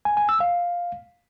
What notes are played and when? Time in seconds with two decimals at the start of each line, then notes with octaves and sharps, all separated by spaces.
0.05 G#5
0.17 G#5
0.29 E6
0.40 F5